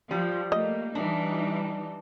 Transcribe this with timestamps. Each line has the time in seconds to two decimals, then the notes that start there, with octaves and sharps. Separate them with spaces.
0.11 F3 G3
0.52 A3 A#3 D#5
0.95 E3 G3 D4 D#4